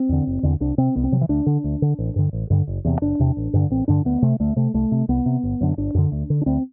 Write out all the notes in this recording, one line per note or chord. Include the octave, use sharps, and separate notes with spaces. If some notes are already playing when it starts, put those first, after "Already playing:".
Already playing: C4
E2 D3
F#1
E2 D3
C2 D4
C3 C4
C2 B3
C4
C3 F#3
E3
D2 D4
D3
D2
D3
A1
G2 D3
A1
G2 D3
F#1
E2 C3
F#1 D4
E2 C3
A1
G2 D3
A1 C4
G2 D3 D4
D2 B3
C3 A3
D2 A3
C3 A3
C2 A3
C3
C2 B3
C3
G1
F#2 D3
G1 D4
F#2 D3
D2
D3
D4
D2 C4